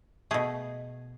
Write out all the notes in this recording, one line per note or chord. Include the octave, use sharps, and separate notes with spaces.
B2 A3 G#4